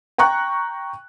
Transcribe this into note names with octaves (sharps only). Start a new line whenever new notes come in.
G5 A#5 C#6 F#6